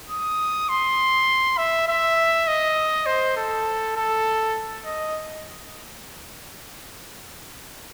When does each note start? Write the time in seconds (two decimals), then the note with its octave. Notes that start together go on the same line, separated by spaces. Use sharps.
0.09 D#6
0.69 C6
1.58 E5
1.88 E5
2.47 D#5
3.06 C5
3.36 A4
3.96 A4
4.85 D#5